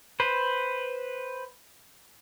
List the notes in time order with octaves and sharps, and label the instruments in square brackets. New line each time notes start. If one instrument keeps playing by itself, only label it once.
[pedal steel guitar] B4 C5